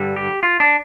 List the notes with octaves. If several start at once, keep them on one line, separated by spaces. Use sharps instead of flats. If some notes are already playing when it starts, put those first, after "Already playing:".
Already playing: G2 D3 G3
G4
F4
D4